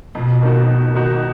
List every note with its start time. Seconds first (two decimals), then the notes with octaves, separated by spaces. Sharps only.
0.15 F2 B2
0.42 D#3 A#3 D#4 F#4
0.68 F2
0.94 D#3 A#3 D#4 F#4